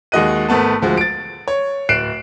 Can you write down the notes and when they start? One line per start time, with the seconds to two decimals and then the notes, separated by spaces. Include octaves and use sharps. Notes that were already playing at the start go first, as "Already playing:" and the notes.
0.12 D#2 G#3 F#4 D#5 F#6 D#7
0.49 G#1 A3 B3 A5
0.82 D2 F3 G#3 F#4
0.98 A6 D7
1.48 C#5
1.89 D1 F#6 C7 D7 E7